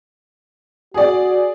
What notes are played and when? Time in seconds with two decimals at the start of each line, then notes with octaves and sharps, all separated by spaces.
0.94 F#4 G#4 D5